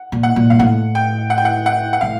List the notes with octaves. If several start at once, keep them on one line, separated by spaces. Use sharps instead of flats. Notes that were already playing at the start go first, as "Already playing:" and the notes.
Already playing: F#5
A#2
F#5
A#2
G#2 F5
A2 F#5
G5
F#5
G5
F#5
F#5
F#5
A2 F5